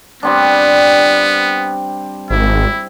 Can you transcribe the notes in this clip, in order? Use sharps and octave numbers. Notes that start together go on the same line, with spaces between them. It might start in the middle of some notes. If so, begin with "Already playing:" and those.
G3 B3 C4 D4
G#1 E4